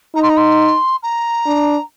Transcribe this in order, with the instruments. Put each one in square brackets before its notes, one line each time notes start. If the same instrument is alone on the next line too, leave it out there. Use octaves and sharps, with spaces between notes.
[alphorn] D#4 [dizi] A#5
[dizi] C6
A#5
C6
A#5
[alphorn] D4